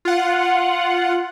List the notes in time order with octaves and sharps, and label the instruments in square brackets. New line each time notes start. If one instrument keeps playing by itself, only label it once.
[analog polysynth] F4 F#5